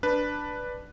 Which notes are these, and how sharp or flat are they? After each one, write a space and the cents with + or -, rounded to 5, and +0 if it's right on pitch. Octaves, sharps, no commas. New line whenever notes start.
D4 +0 B4 +0